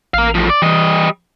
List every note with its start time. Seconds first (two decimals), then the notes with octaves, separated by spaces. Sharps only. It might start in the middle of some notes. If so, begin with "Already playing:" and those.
0.14 A1 A#4 F5
0.35 A2 F3
0.50 D5
0.62 E3 G3 D#5